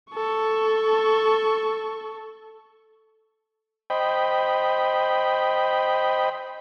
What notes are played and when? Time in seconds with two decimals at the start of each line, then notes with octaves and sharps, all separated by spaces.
0.14 A4 C#6
3.90 C5 D#5 G5 B5